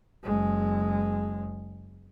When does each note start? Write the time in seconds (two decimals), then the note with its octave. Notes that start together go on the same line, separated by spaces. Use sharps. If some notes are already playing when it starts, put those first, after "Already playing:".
0.23 F#1 G#3